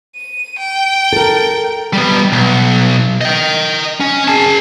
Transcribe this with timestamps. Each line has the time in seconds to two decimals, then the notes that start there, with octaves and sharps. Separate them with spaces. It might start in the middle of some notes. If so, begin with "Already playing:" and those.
0.15 D#7
0.58 G5
1.13 A4 A#4
1.93 G3 B3
2.32 B1
3.21 D#5 G5
4.00 C#4
4.28 G#4 A5